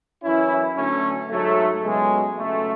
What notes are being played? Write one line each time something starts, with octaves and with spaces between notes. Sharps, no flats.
F#2 E3 C#4 E4
D2 D3 F#3 A3 C#4
G#2 F#3 A3
C#2 B2 F#3 G#3
C#2 C#3 F#3 A3